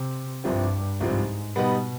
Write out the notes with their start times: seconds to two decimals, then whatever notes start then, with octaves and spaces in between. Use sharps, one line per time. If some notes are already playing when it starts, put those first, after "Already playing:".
Already playing: C3
0.44 C2 G2 C3 F3 C4
1.00 C2 G#2 C3 F3 C4
1.56 B2 G3 B3 D#4 B4